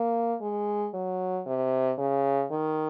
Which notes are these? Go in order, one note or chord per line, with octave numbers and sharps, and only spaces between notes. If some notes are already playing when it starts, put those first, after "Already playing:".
Already playing: A#3
G#3
F#3
C3
C#3
D#3